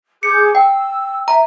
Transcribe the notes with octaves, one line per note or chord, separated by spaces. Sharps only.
G#4 D6 G6 C#7
G5 E6
E5 A#5